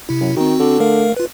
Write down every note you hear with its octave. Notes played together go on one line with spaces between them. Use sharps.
C3 E4
F#2
D#3 C4 F#4
D3
A3 A#4 F5
F4 B4